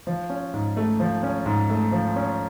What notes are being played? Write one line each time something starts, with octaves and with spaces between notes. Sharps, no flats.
F3
C#4
G#2
A3
F3
C#4
G#2
A3
F3
C#4